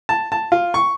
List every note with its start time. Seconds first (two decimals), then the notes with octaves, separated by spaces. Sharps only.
0.09 A5
0.32 A5
0.52 F4
0.74 C#6